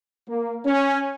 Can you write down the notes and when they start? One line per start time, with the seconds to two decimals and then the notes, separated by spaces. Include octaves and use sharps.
0.29 A#3
0.66 C#4